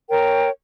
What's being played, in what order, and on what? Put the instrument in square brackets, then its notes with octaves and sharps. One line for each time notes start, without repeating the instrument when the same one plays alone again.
[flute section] A#4 C#5 G5